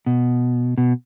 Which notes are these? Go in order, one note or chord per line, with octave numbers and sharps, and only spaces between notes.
B2
B2